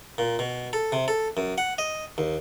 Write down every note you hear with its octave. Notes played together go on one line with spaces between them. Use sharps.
A#2
B2
A4
C3
A4
F#2
F#5
D#5
D#2